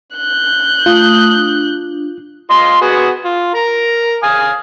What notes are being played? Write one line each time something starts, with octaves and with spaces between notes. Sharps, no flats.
F#6 G6
A3 F4 D#6
D4
F4 D#5 C6
B3 F#4 G#4
F4
A#4 A#5
F5 G#5 D#6